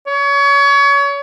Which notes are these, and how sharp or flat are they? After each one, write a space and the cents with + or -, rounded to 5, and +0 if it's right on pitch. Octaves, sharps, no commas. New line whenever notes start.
C#5 +30